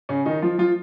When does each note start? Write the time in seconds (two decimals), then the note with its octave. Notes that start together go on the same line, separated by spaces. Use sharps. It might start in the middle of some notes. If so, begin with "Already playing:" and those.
0.09 C#3 C#4
0.26 D#3 D#4
0.42 F3 F4
0.58 F3 F4